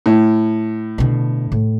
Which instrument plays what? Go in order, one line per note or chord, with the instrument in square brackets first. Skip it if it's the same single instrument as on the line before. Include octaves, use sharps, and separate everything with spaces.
[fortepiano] A2
[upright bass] B2 D3
A2